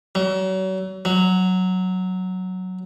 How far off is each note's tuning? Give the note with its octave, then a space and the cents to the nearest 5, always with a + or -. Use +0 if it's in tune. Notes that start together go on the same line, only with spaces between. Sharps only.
F#3 +35
F#3 +0